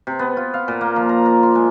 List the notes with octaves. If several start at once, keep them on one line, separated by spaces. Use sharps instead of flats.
C3
B3
F4
F5
A#2
A#3
F3
A#5
A#4
C6
G#3